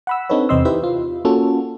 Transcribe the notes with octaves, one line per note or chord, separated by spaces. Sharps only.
F#5 B5 E6
C4 D4 D#4 A4 B4 C#5
E2 C3 C4 D#5 C6 E6
D#4 E4 G4 B4 C5 E5
F4
A#3 C#4 F4 F#4 A4